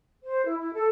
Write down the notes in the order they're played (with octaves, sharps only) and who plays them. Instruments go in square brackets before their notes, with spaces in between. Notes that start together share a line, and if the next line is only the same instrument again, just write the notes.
[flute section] C5
E4
E4
A4